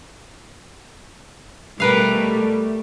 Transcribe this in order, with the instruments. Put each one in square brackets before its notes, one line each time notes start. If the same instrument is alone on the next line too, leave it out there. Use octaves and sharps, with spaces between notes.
[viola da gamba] B2 G3 [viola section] A3 [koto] A#4 B4 F5